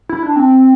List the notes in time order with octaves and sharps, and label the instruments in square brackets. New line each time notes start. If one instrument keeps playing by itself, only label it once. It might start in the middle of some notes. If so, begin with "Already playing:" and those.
[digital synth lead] E4
D4
C4